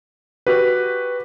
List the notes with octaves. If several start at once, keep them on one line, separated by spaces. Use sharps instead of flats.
F#4 G4 B4